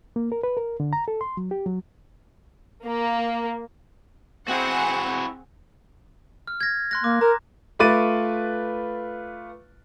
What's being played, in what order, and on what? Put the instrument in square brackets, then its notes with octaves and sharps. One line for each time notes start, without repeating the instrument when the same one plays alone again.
[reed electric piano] A#3
A#4
B4
A#4
D3
A#5
A4
C6
F#3
G4
F#3
[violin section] A#3
[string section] C4 G#4 F#5 [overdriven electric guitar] E4 F#4
[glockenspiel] F6
G#6 A#6
C6 F#6 A#6
[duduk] A#3 [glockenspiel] D6
[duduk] A#4 [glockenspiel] A#5
[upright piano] A3 F4 B4 D6 A6 D#7